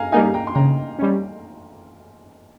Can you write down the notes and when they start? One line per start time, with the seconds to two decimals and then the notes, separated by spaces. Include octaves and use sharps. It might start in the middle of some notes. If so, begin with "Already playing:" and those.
Already playing: F5 G#5 A#5
0.12 G3 A#3 D#4 F5 G#5
0.34 G5 A#5
0.47 C6
0.55 C#3 G5 A#5
0.99 G3 C#4